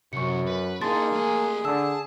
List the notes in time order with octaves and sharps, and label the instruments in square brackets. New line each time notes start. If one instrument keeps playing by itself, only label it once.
[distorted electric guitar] C2 [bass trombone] F#2 [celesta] C#6 C#7
[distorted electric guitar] B4
[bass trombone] A#3 [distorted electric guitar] D#4 E4 [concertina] G#4 [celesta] A5 C6 A6
[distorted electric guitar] A3 G#5
[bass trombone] D3 [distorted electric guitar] A5 [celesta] E6